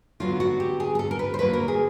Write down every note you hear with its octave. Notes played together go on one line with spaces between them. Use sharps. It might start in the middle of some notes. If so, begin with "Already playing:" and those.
D3 F#3 B3 F4
F#4
G4
G#4
G#4
A4
A#4
B4
C5
D3 F#3 A#3 B4
A#4
G#4